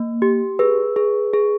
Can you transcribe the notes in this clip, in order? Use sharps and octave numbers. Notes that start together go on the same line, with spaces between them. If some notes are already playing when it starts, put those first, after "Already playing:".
Already playing: A#3
G4
G#4 B4
G#4
G#4